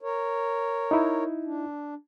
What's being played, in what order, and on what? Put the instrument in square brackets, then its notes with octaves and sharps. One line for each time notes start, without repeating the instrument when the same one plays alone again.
[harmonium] A#4 C#5
[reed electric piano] D#4 E4
[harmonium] D4